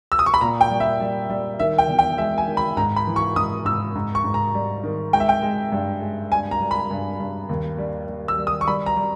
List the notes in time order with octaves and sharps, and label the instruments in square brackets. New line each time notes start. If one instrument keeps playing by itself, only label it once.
[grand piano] E6
D#6
C#6
B5
A#2 A#5
G5
G3
E5
G3
G3
D#3 E5
G5
E2
G5
G#3 E5
G#5
D#3
B5
G#2 A#5
B5
E3
C#6
G#2 D#6
G#2 E6
G#2
C#6
G#2
A#5
G3
D#3
G#3 G5
E5
G5
G#3
G2
G#3
G2 G#5
A#5
G3
B5
G2
G2
D#2
G3
G3
E6
G3
D#6
C#6
G3 B5
A#5
G3